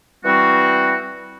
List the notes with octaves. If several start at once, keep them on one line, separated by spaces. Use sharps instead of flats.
E3 G3 C4 F#4